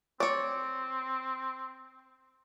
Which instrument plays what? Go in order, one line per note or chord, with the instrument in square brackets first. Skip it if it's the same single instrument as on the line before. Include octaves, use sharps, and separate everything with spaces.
[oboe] C4 [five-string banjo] C#5 D5 [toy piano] C#6 D6